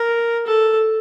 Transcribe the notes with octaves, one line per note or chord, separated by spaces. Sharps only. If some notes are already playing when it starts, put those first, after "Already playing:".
Already playing: A#4
A4